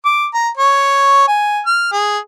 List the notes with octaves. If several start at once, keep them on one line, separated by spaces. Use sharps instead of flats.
D6
A#5
C#5
G#5
F6
G#4